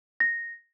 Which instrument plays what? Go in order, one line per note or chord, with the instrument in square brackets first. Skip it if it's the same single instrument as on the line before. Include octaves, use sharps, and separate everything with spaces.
[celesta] A#6